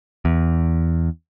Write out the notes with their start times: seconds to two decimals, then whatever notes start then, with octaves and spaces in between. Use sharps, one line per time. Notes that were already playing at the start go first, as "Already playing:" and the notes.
0.25 E2